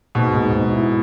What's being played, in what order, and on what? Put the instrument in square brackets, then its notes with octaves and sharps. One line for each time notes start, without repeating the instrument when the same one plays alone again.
[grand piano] G#2 [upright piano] B2
[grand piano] G#2
G#2
E4